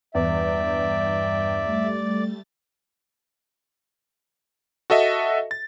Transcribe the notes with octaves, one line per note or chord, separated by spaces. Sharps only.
E2 G2 D5 E5 G5
G3 A3 A6
F#4 A4 D#5 E5
A6